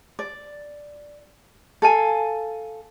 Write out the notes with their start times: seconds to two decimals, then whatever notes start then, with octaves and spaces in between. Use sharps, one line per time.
0.19 D5
1.82 A4 F5 G#5